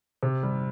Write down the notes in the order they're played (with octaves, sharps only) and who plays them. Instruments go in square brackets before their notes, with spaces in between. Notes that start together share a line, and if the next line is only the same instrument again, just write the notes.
[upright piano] C3
G3